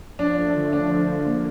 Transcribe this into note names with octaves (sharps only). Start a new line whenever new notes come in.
F3 D4
A3
D3
D3 D4
F3
A3
A#3